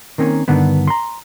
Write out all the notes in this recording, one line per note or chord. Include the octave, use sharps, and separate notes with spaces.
D#3 A#3 C4 C#4
G2 D3 D#3 B3
A#5 C6